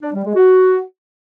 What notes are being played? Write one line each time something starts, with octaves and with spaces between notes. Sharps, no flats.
D4
G3
G#3
F#4